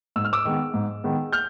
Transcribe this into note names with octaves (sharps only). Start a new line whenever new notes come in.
G#2 E6
F6
D6 E6
D#3 G#3 B3
G#2
D#3 G#3 B3
F6 G6